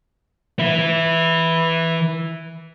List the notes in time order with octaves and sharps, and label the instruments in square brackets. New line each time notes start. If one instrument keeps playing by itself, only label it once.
[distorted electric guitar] E3 E4